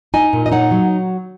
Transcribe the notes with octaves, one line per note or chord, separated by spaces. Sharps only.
D#4 D#5 G#5
A#2
D#5
D#4 C#5 F#5
F#3